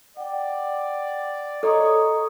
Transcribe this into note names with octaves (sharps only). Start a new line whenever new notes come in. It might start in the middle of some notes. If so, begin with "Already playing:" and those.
D5 F#5 G5
A4 C#5 D#5 A#5 D#6